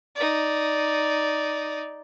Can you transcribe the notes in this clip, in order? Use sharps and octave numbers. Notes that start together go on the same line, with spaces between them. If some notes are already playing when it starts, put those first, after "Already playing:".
D#4 D5